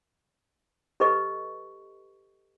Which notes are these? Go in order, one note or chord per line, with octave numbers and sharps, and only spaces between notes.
G4 A4 B4 D#5 C#6